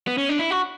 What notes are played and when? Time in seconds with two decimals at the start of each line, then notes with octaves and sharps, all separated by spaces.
0.07 B3
0.18 C#4
0.29 D4
0.39 E4
0.51 F#4